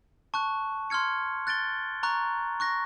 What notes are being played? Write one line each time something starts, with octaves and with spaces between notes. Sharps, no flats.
A5 C#6 F#6
C6 F6 G#6 C#7
F#6 A6 D7 G7
A#5 C#6 F#6
C#6 F#6 A#6